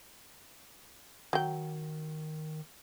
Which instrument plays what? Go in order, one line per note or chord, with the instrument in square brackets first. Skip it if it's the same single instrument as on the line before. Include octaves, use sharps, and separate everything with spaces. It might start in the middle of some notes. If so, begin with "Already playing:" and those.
[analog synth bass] D#3 [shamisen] F#3 G5